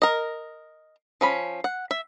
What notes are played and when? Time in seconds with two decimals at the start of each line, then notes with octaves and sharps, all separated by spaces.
0.02 A#4 D#5
1.21 F3 C#4 B5
1.64 F#5
1.91 E5